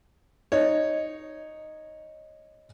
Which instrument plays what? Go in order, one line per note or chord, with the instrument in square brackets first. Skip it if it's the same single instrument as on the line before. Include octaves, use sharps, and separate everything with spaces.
[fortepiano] D#4 C#5